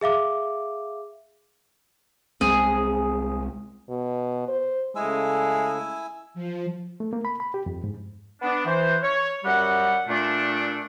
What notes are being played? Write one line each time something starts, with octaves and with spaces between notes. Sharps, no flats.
G#4 E5 F5 D6
C2 G#3 C4 G#4
B2
C5
C#3 G#3 A3 E4 G#5 E6
F3
A3
A#3
B5
B5
G4
F2
G#2
B3 D4
E3 C5
C#5
F#2 G3 G4 F#5
A#2 A3 D4